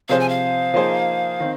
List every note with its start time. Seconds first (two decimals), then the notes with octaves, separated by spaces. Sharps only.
0.09 C3 F3 C4 G#4 C5 F5
0.20 G#5
0.29 F5
0.74 F3 A#3 D#4 G#4 C5
1.40 D#3 C4